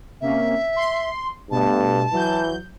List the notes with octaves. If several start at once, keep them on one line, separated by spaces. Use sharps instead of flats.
C3 A#3 C#4 E5
C6
G2 B2 A3 A5
E3 F#3 G6